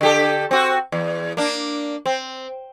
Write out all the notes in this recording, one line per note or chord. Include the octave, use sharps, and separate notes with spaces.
D3 G4 A4
C4 F#4
E2
A#3 D4
C4